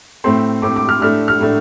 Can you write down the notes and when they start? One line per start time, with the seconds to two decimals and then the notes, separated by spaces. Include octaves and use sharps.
0.24 A2 A3 C4 C6
0.62 A2 A3 C4 D6
0.76 D6
0.89 F6
1.02 A2 A3 D4 F6
1.28 F6
1.40 A2 A3 D4